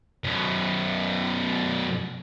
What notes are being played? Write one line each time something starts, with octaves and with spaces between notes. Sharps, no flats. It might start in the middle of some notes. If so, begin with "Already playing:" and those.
F#2 B2